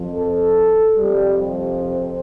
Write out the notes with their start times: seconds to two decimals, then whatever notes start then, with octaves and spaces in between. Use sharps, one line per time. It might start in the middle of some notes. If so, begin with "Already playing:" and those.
Already playing: F2 F3
0.15 A4
0.97 F2 C3 F3 G3
1.81 C4